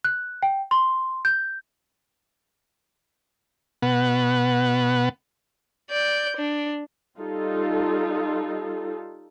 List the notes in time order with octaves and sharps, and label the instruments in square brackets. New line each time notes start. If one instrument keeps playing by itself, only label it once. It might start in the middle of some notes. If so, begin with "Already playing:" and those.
[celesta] F#6
G5
C6
G6
[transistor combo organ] B2 B3 F#5
[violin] D5 G6
D4
[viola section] G3 D#4 F4 A4